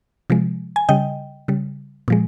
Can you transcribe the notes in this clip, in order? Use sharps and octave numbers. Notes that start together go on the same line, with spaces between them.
C3 F3 G#3
G#5
C#3 G3 D#5 G5
C#3 G3
A#2 F3 G#3